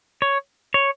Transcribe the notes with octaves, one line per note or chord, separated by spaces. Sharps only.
C#5
C#5